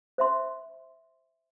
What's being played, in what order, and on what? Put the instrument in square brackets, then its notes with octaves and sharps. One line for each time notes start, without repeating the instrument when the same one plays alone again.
[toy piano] C5 E5 C6